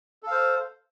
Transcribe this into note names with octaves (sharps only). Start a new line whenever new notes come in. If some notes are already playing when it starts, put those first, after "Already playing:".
A4 C5 F5